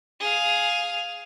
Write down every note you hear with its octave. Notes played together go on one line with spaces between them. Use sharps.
G#4 F5